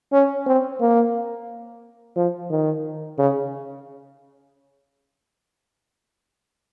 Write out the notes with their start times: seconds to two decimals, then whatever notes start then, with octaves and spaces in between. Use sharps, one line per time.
0.12 C#4
0.47 C4
0.81 A#3
2.16 F3
2.50 D#3
3.18 C#3